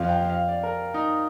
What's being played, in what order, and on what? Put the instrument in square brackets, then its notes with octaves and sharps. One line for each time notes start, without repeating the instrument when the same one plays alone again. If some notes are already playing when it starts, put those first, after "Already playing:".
Already playing: [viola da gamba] F2 [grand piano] F5
[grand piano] G5
F5
D5
A#4
D#4